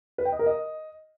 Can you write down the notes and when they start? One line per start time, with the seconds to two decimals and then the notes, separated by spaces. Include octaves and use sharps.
0.18 B4
0.25 G5
0.32 D#5
0.39 A#4
0.46 D#5